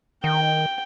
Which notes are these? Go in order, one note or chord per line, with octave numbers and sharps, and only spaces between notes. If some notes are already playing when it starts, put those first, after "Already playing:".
D#3 G5